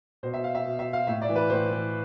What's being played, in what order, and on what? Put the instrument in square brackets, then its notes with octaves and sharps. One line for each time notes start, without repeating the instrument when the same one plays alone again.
[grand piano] B2 C5
E5
F5
E5
B2
E5
F5
A2 E5
D5
E3
B4
A2 C5
E3